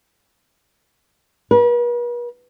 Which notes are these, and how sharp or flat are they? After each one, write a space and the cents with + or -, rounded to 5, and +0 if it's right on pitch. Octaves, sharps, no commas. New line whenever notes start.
B4 -45